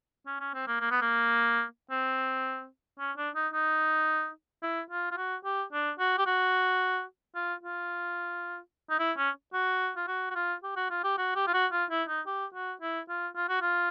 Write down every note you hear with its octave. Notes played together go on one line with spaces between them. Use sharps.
C#4
C#4
C4
A#3
A#3
B3
A#3
C4
C#4
D4
D#4
D#4
E4
F4
F4
F#4
G4
D4
F#4
G4
F#4
F4
F4
D#4
E4
C#4
F#4
F4
F#4
F#4
F4
G4
F#4
F4
G4
F#4
G4
F4
F#4
F4
E4
D#4
G4
F#4
E4
F4
F4
F#4
F4